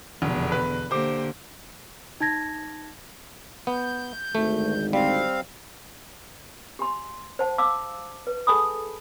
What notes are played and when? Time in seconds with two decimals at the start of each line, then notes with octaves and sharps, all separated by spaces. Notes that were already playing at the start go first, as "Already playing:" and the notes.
0.22 F1 E2 B2 D3
0.52 B4
0.91 D3 A#3 G4 C5 D6
2.20 D#4 A5 G#6 A#6
3.67 B3 G6
4.35 G#1 D2 G#2 A3
4.93 G3 C4 F5
6.79 G4 G#5 C6
7.39 C5 F#5 A5
7.58 F5 A5 D6 E6
8.27 B4
8.47 G#4 A4 G#5 A5 B5 D#6